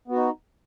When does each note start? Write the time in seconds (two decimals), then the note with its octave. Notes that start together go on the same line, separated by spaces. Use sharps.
0.08 B3
0.12 F#4
0.16 D#4